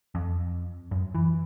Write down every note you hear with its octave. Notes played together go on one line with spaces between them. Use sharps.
F2
F#2
E3